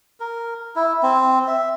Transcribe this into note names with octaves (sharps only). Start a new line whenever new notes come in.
A#4
E4
C4
E5